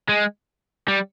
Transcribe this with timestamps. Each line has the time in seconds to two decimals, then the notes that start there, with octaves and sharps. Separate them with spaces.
0.09 G#3
0.88 G3